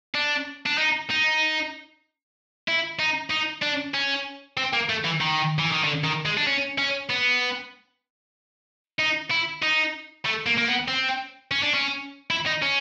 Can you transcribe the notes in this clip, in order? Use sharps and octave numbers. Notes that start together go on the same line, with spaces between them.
D4
D4
D#4
D#4
E4
D#4
D#4
D4
C#4
C4
A#3
A3
E3
D#3
E3
D#3
D3
D#3
G#3
D4
C#4
C#4
B3
D#4
E4
D#4
A3
A#3
A#3
B3
C4
C#4
D4
C#4
E4
D#4
C#4